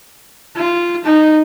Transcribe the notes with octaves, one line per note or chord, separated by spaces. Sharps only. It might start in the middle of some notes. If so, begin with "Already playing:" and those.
F4
D#4